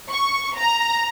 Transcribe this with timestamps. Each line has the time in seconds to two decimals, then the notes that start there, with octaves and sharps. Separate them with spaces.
0.11 C#6
0.57 A#5